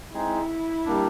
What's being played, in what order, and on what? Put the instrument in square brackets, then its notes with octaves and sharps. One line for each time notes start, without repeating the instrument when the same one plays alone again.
[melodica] G#3 C4 D#4 G#4 [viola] E4
[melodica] G3 A#3 D4